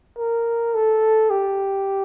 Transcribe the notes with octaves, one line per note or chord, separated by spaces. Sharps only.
A#4
A4
G4